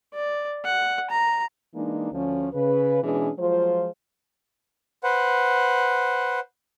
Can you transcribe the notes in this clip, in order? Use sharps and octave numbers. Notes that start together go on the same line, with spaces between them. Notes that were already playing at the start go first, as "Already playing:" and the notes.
D5
F#5
A#5
E3 G#3 A#3 D4 D#4
D2 F3 C#4
C#3 B4
B2 E3 G#3 C#4 D4 G#4
F3 F#3 G#3 F4 C5
B4 C5 F#5